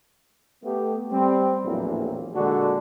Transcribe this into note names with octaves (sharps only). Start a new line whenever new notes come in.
A3 B3 G4
G3 C4
A#1 E2 A2 E3 F#3 A#3
A#2 D3 G#3 D4 F#4